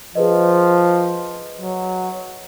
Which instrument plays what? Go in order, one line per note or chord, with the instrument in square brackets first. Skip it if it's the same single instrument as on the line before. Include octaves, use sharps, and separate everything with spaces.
[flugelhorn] F3 [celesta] G#4 B4 D#5
[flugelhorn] F#3